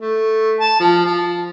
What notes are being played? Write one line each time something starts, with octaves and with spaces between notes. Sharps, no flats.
A3
A5
F3
F3